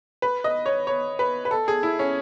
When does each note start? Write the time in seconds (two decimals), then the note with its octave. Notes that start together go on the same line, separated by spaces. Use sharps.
0.22 B4
0.44 D#5
0.66 C#5
0.87 C#5
1.19 B4
1.45 B4
1.51 A4
1.68 G#4
1.83 E4
1.99 C#4